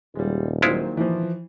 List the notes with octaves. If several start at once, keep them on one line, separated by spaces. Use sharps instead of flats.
D#1 G3 G#3
A#2 D#3 F#3 G#3 E4 F4 C5
E3 F3